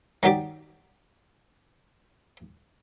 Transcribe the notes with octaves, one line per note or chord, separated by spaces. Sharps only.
D#3 F#3 D#4 G4 D5